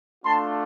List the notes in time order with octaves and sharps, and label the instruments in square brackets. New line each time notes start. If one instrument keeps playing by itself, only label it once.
[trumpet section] A3 D4 F4 A5 C6